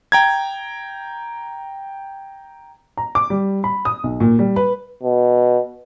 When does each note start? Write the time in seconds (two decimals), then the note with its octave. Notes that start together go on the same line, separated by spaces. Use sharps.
0.12 G5 A#5 G#6
2.97 A#5
3.15 D6
3.30 G3
3.64 B5
3.85 D#6
4.04 B1
4.20 A#2
4.39 G3
4.56 B4
5.03 B2